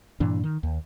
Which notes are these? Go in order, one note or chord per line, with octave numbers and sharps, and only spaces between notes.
G2 A#2 E3 D4
D#3
D#2